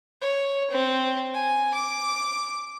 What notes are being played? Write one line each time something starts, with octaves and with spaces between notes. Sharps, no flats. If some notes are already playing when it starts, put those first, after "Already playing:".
C#5
C4
G#5
D6